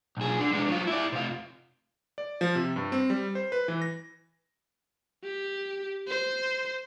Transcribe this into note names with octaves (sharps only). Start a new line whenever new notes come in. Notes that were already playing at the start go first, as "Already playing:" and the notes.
B1 G#4
D3 D4
G#3 D4
F#3 F4
E4 D5
C3 F4
D5
F3
C3
G2
C4
G3
C5
B4
E3
A#6
G4
C5